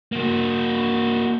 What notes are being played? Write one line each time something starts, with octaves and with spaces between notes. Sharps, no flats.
A#3 F#4